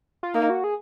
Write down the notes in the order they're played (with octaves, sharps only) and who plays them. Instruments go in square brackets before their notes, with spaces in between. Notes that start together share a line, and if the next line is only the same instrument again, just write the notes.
[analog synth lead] F4
[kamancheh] A#3 [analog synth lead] D#4
[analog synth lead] F#4
G#4